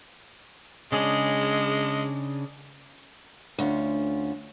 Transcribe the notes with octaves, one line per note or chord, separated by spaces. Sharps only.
C#3 G#3 D4 G#4
D2 C#4 F4